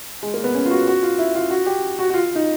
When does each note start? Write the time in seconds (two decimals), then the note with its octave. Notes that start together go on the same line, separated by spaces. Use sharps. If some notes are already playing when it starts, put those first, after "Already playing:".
0.23 G#3
0.34 A#3
0.44 B3
0.54 C#4
0.66 F4
0.71 F#4
0.88 F#4
1.03 F4
1.19 E4
1.35 F4
1.50 F#4
1.66 G4
1.99 F#4
2.10 F#4
2.14 F4
2.35 D#4